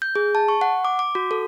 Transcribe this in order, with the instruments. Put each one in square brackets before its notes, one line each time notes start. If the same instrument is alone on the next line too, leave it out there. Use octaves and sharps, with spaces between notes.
[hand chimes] G6
G#4
A5
C#6
F#5
D6
D6
F#4
A4